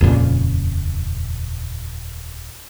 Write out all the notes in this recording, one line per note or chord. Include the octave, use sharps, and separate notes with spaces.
D#1 F2 A#2 C#3